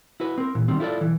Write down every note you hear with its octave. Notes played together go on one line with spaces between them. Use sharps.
E4 F#4 B4
C4 A#4
A#2 E3
D#3 G3 C4
E4 F4 A4 B4 D5
B1 E3